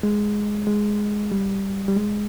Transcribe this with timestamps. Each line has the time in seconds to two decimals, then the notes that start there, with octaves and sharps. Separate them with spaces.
0.03 G#3
0.67 G#3
1.32 G3
1.88 G3
1.96 G#3